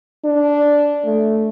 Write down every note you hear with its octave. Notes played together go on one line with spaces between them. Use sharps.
D4
A3